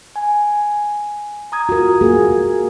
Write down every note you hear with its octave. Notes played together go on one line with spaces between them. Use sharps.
G#5
A#5 D#6 G#6
F4 F#4 A#4
A#3 G#4